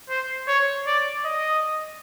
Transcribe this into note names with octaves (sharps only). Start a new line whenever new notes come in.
C5
C#5
D5
D#5